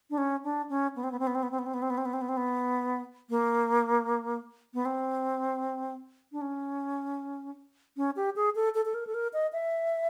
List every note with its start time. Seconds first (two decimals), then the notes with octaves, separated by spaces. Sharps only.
0.10 D4
0.18 C#4
0.44 D4
0.69 C#4
0.96 B3
1.04 C4
1.11 B3
1.19 C4
1.27 B3
1.35 C4
1.43 B3
1.51 C4
1.59 B3
1.66 C4
1.74 B3
1.82 C4
1.90 B3
1.98 C4
2.05 B3
2.13 C4
2.21 B3
2.29 C4
2.37 B3
3.30 A#3
4.74 B3
4.85 C4
6.32 D4
6.41 C#4
7.97 C#4
8.16 G4
8.36 G#4
8.55 A4
8.75 A4
8.85 A4
8.94 A#4
9.07 A4
9.14 A#4
9.33 D#5
9.53 E5